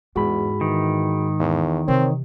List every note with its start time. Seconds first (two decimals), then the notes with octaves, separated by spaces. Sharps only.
0.16 E2 G#2 F#4 G#4 B5
0.61 D#3 E3
1.39 E2
1.88 C3 E3 C4 A#4 C#5